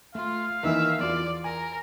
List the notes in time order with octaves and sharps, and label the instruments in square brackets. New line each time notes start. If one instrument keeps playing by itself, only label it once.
[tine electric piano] A3 [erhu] F4 [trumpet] F5
[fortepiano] D#2 D#3 E3 [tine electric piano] A#4 [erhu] E5
[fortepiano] E2 F4 [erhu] D5
[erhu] A#4 [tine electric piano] G#5